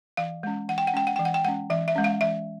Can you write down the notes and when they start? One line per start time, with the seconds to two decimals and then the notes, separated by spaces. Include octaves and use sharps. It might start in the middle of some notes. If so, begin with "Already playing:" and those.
0.17 E3 F5
0.43 G#3 C#4
0.68 E3 F#5
0.78 G5
0.87 F#5
0.94 G#3 C#4 G5
1.07 F#5
1.16 E3 G5
1.25 F#5
1.34 G5
1.45 G#3 C#4 F#5
1.70 E3 E5
1.88 E5
1.96 G#3 C#4
2.04 F5
2.21 E3 E5